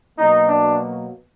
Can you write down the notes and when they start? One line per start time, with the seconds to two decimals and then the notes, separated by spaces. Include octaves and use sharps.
0.18 B2 F#3 A#3 D#4
0.49 D4